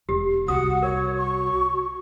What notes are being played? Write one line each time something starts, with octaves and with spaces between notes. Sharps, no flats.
E1 G4
C2 F#4 F#5 D#6
A#4 C#5
C#6